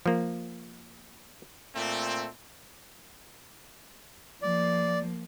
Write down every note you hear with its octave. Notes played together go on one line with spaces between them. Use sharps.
F3 A#3
A#2 A3 C4
F3 A#3 D5